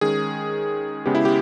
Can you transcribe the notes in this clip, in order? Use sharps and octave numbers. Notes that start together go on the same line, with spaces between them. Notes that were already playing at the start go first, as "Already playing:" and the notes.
D#3 G#3 C#4 G#4
C#3 G#3 B3 G4
E4
G4